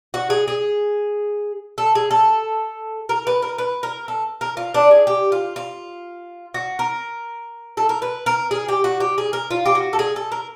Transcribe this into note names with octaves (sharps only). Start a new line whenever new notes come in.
F#4
G#4
G#4
A4
G#4
A4
A#4
B4
A#4
B4
A#4
A4
A#4
F4
D4
G#4
G4
F4
F4
F#4
A#4
A4
A#4
B4
A#4
G#4
G4
F#4
G4
G#4
A#4
F4
G4
F#4
A4
G#4
A4
A#4